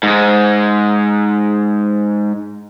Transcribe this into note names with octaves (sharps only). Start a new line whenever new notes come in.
G#2 G#3